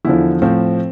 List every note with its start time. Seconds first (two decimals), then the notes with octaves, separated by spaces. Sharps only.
0.05 E2 D3 F3 E4
0.42 A2 F3 C4